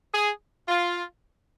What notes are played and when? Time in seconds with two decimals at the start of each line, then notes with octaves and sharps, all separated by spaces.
0.13 G#4
0.69 F4